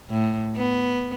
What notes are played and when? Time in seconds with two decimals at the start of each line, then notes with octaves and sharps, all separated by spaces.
0.10 A2
0.56 B3